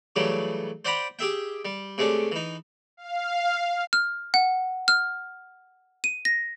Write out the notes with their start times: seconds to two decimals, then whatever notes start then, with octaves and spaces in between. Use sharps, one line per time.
0.16 C#3 E3 F#3 G3 A3
0.85 C5 D5 F#5 G5 A#5 B5
1.19 G4 G#4 E5 G5
1.65 G3
1.98 C3 G#3 A3 C#4 D4
2.32 E3 D#4
2.97 F5
3.93 F6
4.34 F#5
4.88 F6
6.04 D#7
6.25 A#6